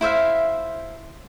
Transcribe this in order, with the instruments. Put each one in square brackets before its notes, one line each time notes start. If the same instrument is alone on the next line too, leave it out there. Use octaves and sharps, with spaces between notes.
[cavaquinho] E4 C5 E5 F5